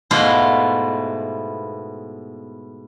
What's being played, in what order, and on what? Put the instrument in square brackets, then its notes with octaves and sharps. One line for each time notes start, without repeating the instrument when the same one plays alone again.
[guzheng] G#2 B2 A3 B3 E4 F4